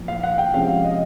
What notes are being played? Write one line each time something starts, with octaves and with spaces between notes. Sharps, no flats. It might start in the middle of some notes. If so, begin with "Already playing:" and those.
Already playing: A#2 F3
F5
F#5
G5
C3 F3 G#3 C#4 F5
D#5